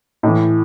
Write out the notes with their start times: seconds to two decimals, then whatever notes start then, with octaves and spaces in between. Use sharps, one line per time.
0.23 A2 E3